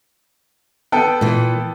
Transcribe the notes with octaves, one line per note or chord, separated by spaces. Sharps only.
B3 A4 G5
A#2 E3